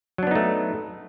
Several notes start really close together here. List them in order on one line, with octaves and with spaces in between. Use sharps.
F#3 D4 B3 D#4 A3